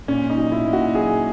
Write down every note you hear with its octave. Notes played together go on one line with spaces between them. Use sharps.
A#2 C#4
D#4
F#3
E4
A#2
F#4
F#3 G#4